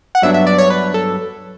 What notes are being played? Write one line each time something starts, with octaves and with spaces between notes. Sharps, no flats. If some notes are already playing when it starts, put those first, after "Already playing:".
F#5
G2 F#3 B3 D4 E5
E5
D5
C#5
B4
A4